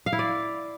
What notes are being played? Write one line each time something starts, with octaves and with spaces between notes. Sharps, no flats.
F5
E4
D5